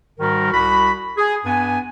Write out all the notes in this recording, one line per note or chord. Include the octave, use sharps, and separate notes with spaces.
G#2 D#3 G3 F#4 A#4
C2 F#4 B5
G#4
G2 B3 G#5